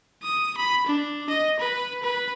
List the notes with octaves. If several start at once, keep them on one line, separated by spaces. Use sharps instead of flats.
D#6
B5
D4
D#5
B4
B4